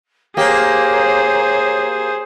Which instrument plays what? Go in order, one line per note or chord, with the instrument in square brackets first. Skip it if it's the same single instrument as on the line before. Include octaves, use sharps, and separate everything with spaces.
[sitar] A#3 G4 [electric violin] G#4 C5 [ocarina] C#5